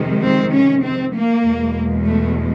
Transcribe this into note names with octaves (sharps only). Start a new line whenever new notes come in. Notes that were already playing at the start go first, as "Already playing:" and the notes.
Already playing: F2 C3 D#3 G#3
C4
C#4
C4
A#3
E2 B2 G#3
A3